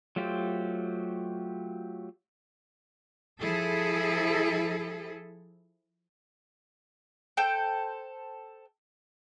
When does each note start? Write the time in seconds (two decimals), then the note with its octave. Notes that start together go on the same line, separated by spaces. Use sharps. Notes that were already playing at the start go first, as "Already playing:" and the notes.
0.16 F#3 A3 F4 G4 C5
3.39 F3 E4 G#4 A4
7.37 A4 C5 G5 G6